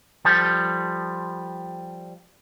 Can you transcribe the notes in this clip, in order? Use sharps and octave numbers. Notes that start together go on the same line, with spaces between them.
F3 G3 A4